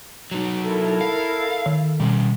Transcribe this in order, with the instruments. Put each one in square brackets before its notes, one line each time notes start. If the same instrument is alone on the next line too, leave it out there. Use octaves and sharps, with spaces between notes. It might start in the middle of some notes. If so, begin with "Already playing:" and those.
[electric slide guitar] F#3 D#4
[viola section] E4 A4 A#4
[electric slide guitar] F5
[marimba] D#3
[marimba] B2 [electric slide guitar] G3 C#4